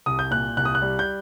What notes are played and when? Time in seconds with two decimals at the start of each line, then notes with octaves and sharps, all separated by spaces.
0.06 C2 D#6
0.19 G6
0.31 A#2 F#6
0.57 C2 F#6
0.65 D#6
0.75 F#6
0.82 G3
0.99 G6